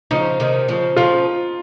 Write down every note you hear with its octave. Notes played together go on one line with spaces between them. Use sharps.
C#3 F3 D#4
C3 D#3
C#3 F3
C#3 F3 F4